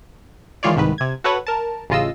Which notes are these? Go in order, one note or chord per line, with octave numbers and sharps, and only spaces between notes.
D#3 E3 G#3 F4 C#5 D5
C2 G#2 D#3 B4
C3 G#6
F#4 A4 B4 C#5 F#5
A#4 A5
A1 C#3 F4 D#5 E6